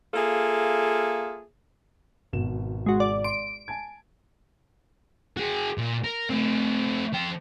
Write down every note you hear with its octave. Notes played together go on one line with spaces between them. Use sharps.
A#3 F4 G#4 A4 E5
G#1 B2 E7
G#3 F#4
D5
C6 D7
G#5 A5 G#6
F#4 G#4
A#2
A#4
A3 C4
F3 G5